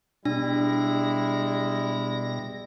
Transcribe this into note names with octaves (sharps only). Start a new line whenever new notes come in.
B2 G3 G#3 D4 E4 A#6